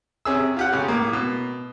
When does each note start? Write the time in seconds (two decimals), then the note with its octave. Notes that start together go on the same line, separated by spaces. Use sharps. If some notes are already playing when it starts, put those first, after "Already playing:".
0.25 C3 C#4 G#4 E6
0.57 F4 G4 F#5
0.72 B1 C#3
0.88 A2 A#3
1.13 B2